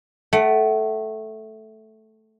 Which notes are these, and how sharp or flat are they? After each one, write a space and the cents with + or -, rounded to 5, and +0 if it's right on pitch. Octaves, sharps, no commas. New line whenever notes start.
A3 -5 F#5 +35